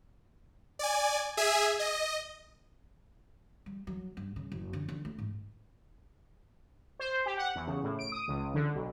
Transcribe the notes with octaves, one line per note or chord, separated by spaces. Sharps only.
D5 G#5
G#4 E5 G#5
D#5
G3
F#3
G2
C#3
F#1
D3
D3
A3
G#2
C5
G4
F#5
E2
C#3
A2
D7
D#6
C#2
D3
B1